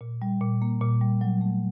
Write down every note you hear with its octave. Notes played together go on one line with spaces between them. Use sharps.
A#2
G3
A#2
A#3
A#2
G3
F#3
A3